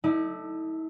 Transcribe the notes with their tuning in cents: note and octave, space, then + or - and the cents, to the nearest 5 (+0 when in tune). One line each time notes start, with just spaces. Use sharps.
A3 +0 E4 -45 D5 +35